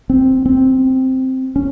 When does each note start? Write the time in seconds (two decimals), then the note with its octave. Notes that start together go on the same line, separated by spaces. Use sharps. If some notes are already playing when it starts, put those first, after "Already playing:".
0.10 C4
0.46 C4
1.56 C#4